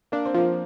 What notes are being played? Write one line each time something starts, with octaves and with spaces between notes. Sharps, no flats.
A#3 D4
C4
F3 A#3